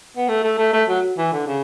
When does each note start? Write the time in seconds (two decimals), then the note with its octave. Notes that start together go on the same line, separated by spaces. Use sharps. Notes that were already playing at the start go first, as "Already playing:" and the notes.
0.17 B3
0.29 A3
0.43 A3
0.58 A3
0.73 A3
0.89 F#3
1.18 E3
1.33 D3
1.47 C#3